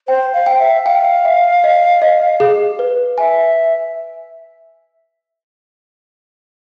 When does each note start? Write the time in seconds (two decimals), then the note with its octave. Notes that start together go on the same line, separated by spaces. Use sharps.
0.08 C5 G5
0.33 F5
0.46 G5
0.59 E5
0.86 F5 G5
1.25 E5
1.64 D#5
2.02 D#5
2.40 G#4
2.79 B4
3.18 E5 G#5